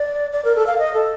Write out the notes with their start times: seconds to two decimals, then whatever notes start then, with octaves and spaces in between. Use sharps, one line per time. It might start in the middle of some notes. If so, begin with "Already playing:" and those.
Already playing: D5
0.32 D5
0.45 A#4
0.56 A4
0.67 F5
0.79 D#5
0.94 A4